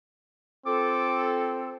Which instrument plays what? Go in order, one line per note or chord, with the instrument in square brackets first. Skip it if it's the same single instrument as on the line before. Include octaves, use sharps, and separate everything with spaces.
[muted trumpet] C4 [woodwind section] F4 A4 [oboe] D6